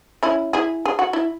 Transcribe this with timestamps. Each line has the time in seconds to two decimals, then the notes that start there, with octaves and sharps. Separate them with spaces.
0.23 C#4 E4
0.53 E4 G#4
0.85 G#4
0.99 F#4
1.13 E4